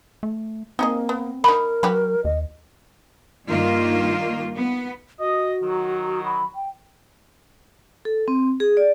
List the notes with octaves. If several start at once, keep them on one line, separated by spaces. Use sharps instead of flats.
A3
A#3 C4 D#4 G#4 D#5
B3
A#3 D#4 A#4 B5
F#3 F#4 G4 B4
D#2 D#5
G2 D#3 A#3 F4
B3
F#4 D#5
D#3 F#3
B5
G5
A4
C4
G#4
D5